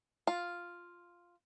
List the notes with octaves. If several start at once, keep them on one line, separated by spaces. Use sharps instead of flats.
F4